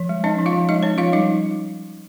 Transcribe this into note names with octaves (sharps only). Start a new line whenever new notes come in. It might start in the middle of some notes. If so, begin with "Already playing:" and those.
Already playing: F3
G#3
C#4 D#4 D#5
F3
F4 F5
F3
G#3 D#4 D#5
C#4 C#5
F3 F4 F5
G3 D#4 D#5